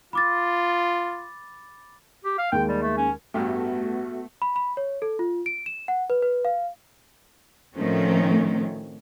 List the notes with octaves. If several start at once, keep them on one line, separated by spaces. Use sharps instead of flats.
F4 B5 D6 A6
G4
F5
D#2 G#3 G5
G3
A3
C#4
A1 G2 A3 B3 F#4 G4
B5
B5
C#5
A4
F4
D7
E7
F#5
B4
B4
F5
A2 D#3 F3 A3 C4 C#4